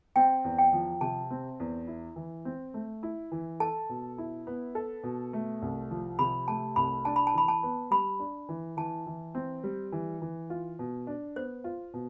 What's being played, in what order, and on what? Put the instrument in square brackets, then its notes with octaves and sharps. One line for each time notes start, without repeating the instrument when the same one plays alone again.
[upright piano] C4 [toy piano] G5
[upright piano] E2
[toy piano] G5
[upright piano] F3
[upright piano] C3 [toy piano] A5
[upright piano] C4
E2
E4
E3
C4
A3
E4
E3
[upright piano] A4 [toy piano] A5
[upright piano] B2
E4
B3
A4
B2
A3
C2
F3
[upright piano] C3 [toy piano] B5
[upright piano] A3 [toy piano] A5
[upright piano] C2 [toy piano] B5
[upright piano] D4 [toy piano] A5
[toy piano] B5
A5
[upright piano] E3 [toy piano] B5
[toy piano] A5
[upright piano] B3
[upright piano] G3 [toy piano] B5
[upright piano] D4
E3
[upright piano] E3 [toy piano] A5
[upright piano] E3
C4
G3
E3
E3
F4
B2
D4
[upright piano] B3 [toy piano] C5
[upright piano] F4
B2